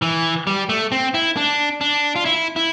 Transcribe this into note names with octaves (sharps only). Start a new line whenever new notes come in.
E3
G3
A3
C4
E4
D4
D4
F4
E4
E4